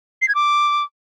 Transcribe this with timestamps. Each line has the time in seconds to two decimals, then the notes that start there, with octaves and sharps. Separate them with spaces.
0.22 C7
0.28 G#6
0.35 D6